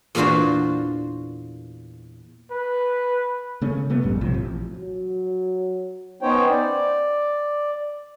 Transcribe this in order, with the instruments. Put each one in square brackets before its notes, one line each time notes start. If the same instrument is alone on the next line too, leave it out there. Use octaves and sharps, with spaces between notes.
[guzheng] E2 A#2 D4 F4 F#4 C5
[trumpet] B4
[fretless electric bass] C#3 A3 C#4
C3 A3 B3
A#1 F2 G#2 G3
A#1 A2 C3 F3
A1
[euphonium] F#3
[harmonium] B3 C#4 D#4 C5 C#5 G5
D5